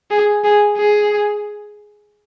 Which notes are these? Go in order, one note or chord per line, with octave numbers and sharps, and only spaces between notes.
G#4
G#4
G#4